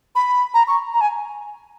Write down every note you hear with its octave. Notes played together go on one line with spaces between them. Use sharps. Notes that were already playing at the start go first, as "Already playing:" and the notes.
B5
A#5
C#6
A#5
G#5